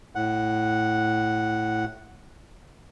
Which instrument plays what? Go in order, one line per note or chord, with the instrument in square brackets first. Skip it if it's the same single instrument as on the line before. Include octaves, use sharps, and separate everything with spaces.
[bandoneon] A2 F#5